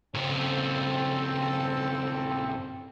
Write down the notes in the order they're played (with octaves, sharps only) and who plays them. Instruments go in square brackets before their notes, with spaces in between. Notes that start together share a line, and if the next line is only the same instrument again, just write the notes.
[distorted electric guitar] G2 C#3 [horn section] C4 A4